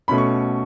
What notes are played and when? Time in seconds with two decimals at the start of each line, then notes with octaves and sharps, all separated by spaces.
0.08 B2 A3 C#4 B5
0.18 C#6